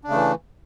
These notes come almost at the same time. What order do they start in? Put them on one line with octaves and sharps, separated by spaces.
D4 C#3 A3 E3